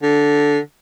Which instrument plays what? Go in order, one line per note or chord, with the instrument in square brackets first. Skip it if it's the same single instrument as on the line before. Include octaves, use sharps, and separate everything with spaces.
[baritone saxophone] D3